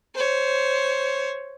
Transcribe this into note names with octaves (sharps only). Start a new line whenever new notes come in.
C5 C#5